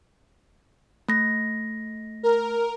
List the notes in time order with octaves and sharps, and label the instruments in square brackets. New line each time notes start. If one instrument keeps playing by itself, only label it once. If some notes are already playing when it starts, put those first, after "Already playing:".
[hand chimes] A3 A#6
[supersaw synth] A#4